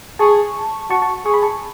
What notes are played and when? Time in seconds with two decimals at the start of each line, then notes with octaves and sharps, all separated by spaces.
0.19 G#4 A5 C#6
0.90 F#4 A5 C#6
1.02 A5 C#6
1.25 G#4 C#6
1.34 B5
1.42 A5 C#6